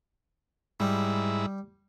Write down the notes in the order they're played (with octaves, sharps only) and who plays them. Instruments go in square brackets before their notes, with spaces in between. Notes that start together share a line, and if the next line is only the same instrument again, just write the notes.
[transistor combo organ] G#2 E4 [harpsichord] G3